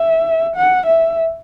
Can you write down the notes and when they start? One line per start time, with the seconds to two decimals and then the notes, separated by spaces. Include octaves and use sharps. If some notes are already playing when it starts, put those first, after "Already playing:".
Already playing: E5
0.56 F#5
0.87 E5